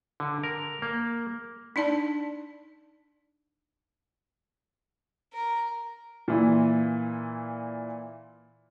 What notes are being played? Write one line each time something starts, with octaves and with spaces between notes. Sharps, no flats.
D3
A#4
A#3
D4 D#4 D5 A5
A#4
A#2 E3